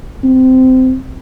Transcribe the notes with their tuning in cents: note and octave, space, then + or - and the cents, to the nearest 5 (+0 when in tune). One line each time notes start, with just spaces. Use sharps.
C4 -20